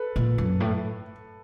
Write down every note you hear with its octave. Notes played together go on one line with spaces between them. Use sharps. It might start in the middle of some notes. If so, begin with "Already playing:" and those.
Already playing: A4 B4
A#2
F#2
A2